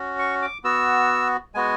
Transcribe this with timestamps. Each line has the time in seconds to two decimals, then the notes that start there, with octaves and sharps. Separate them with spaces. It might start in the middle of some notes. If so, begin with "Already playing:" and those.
Already playing: C#4 F#4
0.19 C#6
0.42 D6
0.64 B3 F#4 E6
1.55 G#3 B3 F#4 G#5